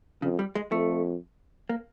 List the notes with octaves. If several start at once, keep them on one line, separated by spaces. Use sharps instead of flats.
F2 C#3
G3
G#3
F2 A3
A#3